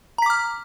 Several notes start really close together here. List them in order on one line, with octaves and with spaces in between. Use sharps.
A#5 B6 D6 F6